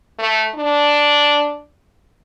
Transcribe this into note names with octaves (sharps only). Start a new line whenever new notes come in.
A3
D4